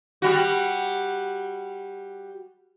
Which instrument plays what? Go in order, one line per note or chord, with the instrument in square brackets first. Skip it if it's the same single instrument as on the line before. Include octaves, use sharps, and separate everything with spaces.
[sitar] G3 F#4